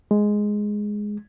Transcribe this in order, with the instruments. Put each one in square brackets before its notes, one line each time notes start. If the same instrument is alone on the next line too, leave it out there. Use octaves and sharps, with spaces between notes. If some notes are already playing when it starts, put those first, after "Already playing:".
[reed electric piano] G#3